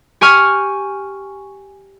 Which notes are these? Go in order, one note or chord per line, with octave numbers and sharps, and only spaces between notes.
G4 G#5 C#6 F6